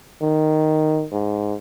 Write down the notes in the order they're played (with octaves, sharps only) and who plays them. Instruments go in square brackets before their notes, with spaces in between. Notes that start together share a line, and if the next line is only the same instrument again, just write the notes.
[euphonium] D#3
G#2